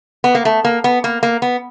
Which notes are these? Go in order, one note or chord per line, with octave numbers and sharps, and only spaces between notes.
B3
A#3
A3
A#3
B3
A#3
A#3
B3